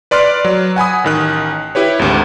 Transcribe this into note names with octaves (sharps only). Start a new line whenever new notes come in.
B4 D5 C6 F6 F#6
F#3
F#5 G#5 B5 D#6
A1 D#3 F#6
E4 G4 B4 C#5
G#1 D2